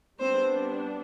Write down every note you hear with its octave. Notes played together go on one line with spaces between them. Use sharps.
G3 B3 C4 D4 C5